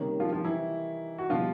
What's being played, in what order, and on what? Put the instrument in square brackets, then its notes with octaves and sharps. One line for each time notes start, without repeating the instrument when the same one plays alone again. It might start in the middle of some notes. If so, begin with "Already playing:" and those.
Already playing: [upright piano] C3 D#3 G3 A#3 C#4
[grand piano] F3 F4
F3 F4
E3 E4
F#4
[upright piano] B2 G3 [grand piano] F3 F4